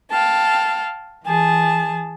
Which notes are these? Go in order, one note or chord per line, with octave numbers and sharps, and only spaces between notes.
F5 G5 A5
E3 G#4 A5